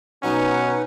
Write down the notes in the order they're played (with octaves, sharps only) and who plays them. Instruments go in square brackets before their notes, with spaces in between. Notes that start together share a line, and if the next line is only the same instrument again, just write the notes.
[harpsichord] B2 F#3 B3 [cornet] C#4 [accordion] D#4 B4 F#5